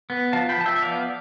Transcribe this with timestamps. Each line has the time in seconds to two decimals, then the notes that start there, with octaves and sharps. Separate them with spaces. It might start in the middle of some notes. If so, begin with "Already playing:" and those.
0.10 B3
0.33 F3 F5 A5
0.49 G5 B5
0.58 F3 A5
0.66 E5 G5
0.76 E5
0.82 B3 D5 F5